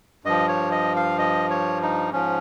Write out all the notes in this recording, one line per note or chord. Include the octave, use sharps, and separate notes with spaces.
G2 F3 D#5
C#5
D#5
F5
D#5
C#5
D#4
G#2 F3 C#4